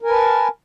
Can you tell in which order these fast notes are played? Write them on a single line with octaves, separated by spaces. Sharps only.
A#4 G#5 B4 A5